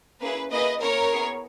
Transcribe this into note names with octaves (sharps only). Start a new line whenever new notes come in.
A#3 C#4 E4 G#4 B4
A#3 E4 G#4 B4 D#5
A#3 C#4 E4 A#4 C#5
B3 E4 G#4